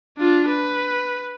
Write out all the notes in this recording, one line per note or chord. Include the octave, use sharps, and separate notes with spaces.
D4 F4
B4